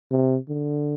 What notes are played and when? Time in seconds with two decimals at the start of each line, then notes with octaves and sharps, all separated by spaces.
0.11 C3
0.49 D3